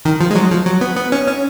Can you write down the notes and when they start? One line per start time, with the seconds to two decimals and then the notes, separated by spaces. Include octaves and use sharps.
0.05 D#3
0.21 F3
0.31 G#3
0.35 F#3
0.50 F3
0.65 F#3
0.81 B3
0.96 B3
1.12 C#4
1.27 C#4